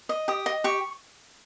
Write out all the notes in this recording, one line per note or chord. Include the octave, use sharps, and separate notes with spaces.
D#5
G4 D#6
D#5
G4 C#6